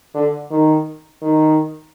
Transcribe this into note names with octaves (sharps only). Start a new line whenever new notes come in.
D3
D#3
D#3